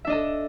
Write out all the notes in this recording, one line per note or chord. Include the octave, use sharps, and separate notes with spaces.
D4 A4 D#5 E5